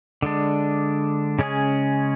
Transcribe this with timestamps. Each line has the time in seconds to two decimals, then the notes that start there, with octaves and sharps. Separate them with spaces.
0.22 D3 G#3 D4
1.39 C#3 G#3 C#4 G#4